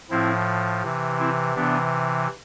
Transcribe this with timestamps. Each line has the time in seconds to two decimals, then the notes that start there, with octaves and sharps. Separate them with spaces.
0.10 A2 F3 C4 E4
0.83 C3 E3
1.19 C4 E4
1.55 C3 E3 B3 D4